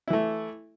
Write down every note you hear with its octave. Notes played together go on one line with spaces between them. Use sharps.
E3 A3 E4